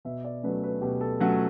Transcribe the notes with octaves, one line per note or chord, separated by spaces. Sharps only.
B2 E5
D5
F#3 A3 C#4 B4
B4
B2 G4
A4
F#3 A3 C#4 F#5